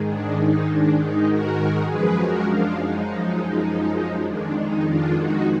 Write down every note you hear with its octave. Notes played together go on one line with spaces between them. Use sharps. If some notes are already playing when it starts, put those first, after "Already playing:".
Already playing: G#2 D#3 G#3
D4
D#4
D4
D#4
F#4 A#4
F#2 F3 G#3 G#4 B4
F#4 A#4
D4 F4
D#4
F2 D#3 G#3 D4
D#4
D4 F4
D#4 F#4